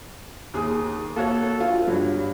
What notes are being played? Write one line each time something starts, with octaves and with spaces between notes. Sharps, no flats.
D#2 G#4 D#6
A#3 F#4 A4 C#5
D2 F4
G2 F#3